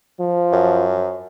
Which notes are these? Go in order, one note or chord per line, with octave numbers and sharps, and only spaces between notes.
F3
F#2